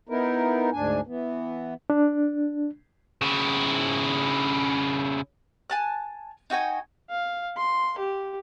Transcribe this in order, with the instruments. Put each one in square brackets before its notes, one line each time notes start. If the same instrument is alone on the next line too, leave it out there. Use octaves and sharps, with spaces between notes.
[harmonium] B3 D#4 E4 A#4
D2 G#2 D4 G#5
E3 B3
[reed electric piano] D4
[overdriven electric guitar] C#3 E4
[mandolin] G#5 A5 F#6
D#4 F#4 G5 G#5
[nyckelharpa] F5
C6
G4